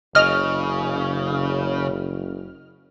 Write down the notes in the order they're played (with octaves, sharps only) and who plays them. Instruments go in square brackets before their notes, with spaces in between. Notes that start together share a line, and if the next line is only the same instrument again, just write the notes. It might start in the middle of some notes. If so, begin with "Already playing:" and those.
[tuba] F#1 [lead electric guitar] C#3 [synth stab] D#5 F6